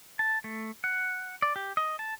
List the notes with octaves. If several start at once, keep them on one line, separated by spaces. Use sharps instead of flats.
A5
A3
F#5
D5
G4
D#5
A5